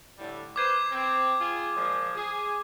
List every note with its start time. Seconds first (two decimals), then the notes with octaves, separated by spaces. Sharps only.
0.18 A2 D3 G3
0.56 B4 C5 D6 G#6
0.92 C4
1.39 F4 G#4
1.75 A#2 F3 G#3
2.15 G#4